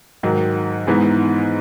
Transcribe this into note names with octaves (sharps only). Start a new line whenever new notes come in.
G#2 D#3 F#3
G#2 E3 G#3 B3 D#4